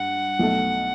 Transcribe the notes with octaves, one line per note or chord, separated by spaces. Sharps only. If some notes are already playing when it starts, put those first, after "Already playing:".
Already playing: G2 F#5
B1 B2 A3